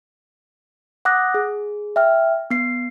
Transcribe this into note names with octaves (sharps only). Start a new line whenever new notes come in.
F#5 D6 D#6 F#6 A#6
G#4
E5 G5 F6
B3 C7